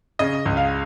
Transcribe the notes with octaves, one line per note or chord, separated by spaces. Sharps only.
C#3 D#5
C#2
F5